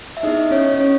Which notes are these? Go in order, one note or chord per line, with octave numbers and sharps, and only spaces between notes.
E5
B3 D#4 E4 G#4 D#5
C#4 C#5
C#4 C#5